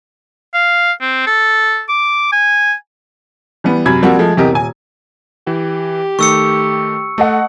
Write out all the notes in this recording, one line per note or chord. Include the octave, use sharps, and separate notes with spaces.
F5
C4
A4
D6
G#5
E3 G3 B3
F#2 C3 B5 G#6
F3 G3 A#3 C4 F#4
F3 G#3 A3
E2 C3 G4 A#4 D#5
D#1 G#5
E3 G4
D#3 A3 C#6 E6 C#7
A3 A4 D#5 F#5